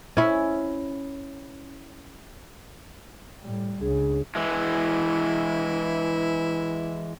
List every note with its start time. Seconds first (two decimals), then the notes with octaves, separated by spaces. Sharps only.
0.17 C#4 E4
3.41 A2 G3
3.81 C#2 C#3 D4 G#4
4.35 E3 G#3 E4